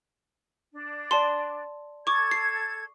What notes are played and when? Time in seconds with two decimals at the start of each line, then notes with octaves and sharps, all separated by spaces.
0.72 D4
1.11 D5 A5 C6
2.07 A4 C#6 D6 G#6
2.31 C7